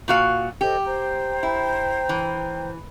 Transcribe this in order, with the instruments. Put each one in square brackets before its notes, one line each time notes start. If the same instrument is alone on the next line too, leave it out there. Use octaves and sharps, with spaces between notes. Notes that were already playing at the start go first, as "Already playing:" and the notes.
[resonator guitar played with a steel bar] A#2 F#4 F5
[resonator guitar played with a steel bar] G4 [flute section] A4 C5 D#5
[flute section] C5 G5 A#5
[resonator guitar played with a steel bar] E4
E3